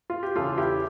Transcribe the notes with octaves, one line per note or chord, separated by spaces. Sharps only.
F4
G4
E2 C#3 E3 F4 A4
E4 G4